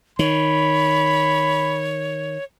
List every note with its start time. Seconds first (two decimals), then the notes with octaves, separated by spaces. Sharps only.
0.19 D#3 C#5 B5